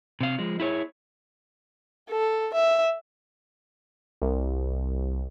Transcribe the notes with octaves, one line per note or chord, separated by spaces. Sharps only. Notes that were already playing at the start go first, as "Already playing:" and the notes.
C3 F5
F3 G#3
E4 G#4 C#5
A4
E5
C2